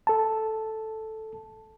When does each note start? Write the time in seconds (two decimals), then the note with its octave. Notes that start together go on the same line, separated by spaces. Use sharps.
0.07 A4 A5